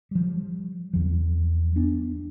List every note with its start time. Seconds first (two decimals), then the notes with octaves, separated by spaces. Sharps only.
0.11 F3 G3
0.93 E2 F3
1.76 B3 D4